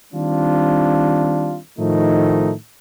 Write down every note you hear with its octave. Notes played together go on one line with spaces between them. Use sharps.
D#3 G3 C4 D4 F4
A2 D#3 F3 A3 D#4